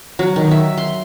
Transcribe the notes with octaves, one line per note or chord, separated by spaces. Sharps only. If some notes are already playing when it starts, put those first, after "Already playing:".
F#3
D#3
E5
C6